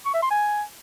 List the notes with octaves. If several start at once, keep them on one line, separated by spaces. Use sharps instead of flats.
C#6
E5
C6
G#5